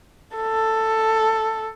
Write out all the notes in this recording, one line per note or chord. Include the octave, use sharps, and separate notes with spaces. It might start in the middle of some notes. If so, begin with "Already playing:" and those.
A4